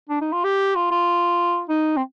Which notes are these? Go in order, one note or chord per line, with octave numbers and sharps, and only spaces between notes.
D4
D#4
F4
G4
F4
F4
D#4
C4